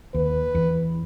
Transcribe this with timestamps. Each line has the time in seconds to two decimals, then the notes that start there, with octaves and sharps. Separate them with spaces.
0.14 D#2 B4
0.55 E2